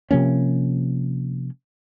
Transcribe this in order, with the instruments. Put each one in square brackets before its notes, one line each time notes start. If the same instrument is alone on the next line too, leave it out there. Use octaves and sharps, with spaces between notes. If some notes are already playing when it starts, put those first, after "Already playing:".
[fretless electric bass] C3 F3 A#3 C#4